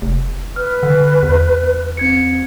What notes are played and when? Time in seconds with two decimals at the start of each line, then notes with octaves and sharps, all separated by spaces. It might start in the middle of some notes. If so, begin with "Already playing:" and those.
0.02 F1
0.56 B4 F6
0.83 D3
1.23 E2
1.97 C4 G#6 C#7